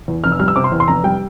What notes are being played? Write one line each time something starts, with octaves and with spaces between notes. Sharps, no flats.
E2
F1 F6
E6
G3 F6
E6
C3 D6
C6
E2
C6
F1 A#5
G3 G5